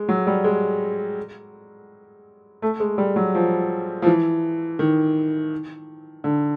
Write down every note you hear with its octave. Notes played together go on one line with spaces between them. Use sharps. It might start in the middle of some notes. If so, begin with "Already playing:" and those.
Already playing: G#3
F#3
G3
G#3
A3
G#3
G3
F#3
F3
F3
E3
D#3
D3